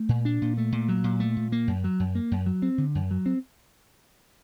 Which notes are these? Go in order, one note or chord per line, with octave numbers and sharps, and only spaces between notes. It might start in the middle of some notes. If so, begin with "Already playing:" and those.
Already playing: A3
A#2
D4
A#2
A3
A#2
F#3
A#2
A3
A#2
A#3
F#2
F#3
F#2
A#3
F#2
F#3
C4
D3
F#2
F#3
C4